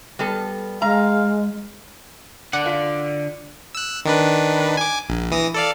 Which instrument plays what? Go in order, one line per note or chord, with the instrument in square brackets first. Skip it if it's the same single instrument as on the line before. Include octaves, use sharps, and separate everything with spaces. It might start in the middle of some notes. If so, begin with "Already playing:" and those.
[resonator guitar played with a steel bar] G3 B3 A4
[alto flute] G#3 [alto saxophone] F5 [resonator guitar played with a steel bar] A#5
[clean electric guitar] D3 D5 [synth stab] F#5
[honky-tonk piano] F4 B6
[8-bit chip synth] E6 F#6
D#3 D4 B4
G#5 D6
A#1
E3 D#6 A#6
A4 D5 F5